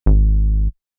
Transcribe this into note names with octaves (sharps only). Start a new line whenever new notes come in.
G#1